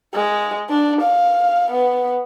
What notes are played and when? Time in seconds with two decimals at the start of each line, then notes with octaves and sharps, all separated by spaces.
0.14 G#3
0.69 D4
1.01 F5
1.71 B3